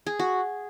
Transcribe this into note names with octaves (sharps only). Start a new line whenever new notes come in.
G#4
F#4